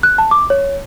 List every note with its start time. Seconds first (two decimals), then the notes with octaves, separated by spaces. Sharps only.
0.03 F#6
0.18 A5
0.31 D6
0.50 C#5